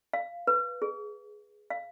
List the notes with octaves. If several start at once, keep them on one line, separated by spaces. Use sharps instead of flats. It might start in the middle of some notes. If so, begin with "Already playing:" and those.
F5
B4
G#4
F5